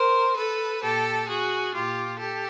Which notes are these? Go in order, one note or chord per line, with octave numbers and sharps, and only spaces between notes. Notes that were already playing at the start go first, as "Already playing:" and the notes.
Already playing: A#4 C5
A4 B4
A#2 G4 A4
F#4 G#4
A#2 F4 G4
G4 A4